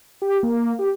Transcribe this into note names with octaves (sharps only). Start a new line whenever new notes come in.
G4
A#3
G4